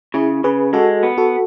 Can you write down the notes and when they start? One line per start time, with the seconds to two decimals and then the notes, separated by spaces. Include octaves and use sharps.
0.14 C#3 E4 G#4
0.44 C#3 G#4 B4
0.73 G#3 F#4 A4
1.03 B3
1.18 F#4 A4